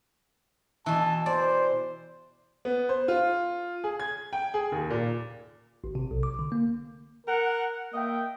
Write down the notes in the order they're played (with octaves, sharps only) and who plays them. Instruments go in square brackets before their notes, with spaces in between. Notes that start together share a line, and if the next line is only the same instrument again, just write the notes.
[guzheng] B2 E3 [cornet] A5
[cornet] C5 [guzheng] D5
[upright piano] B3
C5
F4
G#4
G#6
G5
G#4
D#2
A#2
[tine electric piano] G#1
C3
B1
D6
D3
A#3
[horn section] A#4 F#5
A#3 D#5 E5 G5